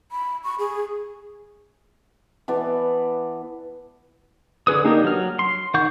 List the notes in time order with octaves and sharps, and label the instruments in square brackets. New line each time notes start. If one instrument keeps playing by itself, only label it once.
[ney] B5
C#6
G#4
[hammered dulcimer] E3 B3 D5 A5
[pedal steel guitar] D3 G#4 B4 D#6
A#3 D4 D#4 G4 A#4
F#3 F6
C6
D#3 F#5 C#6 G6